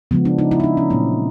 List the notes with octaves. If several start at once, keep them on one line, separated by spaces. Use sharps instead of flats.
C#3 F3 G#3 B3
D4
D#4
E4
D#4
D4
C#4
A#2 F#3 A#3 C4